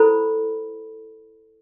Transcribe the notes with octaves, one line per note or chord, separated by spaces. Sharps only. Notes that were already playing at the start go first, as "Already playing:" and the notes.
Already playing: E4 A4 C5 B5